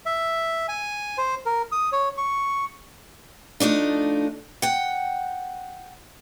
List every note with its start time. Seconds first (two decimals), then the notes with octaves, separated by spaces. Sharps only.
0.06 E5
0.68 G#5
1.18 C5
1.46 A#4
1.72 D#6
1.93 C#5
2.18 C#6
3.60 F3 A3 D4 D#4
4.62 F#5 G5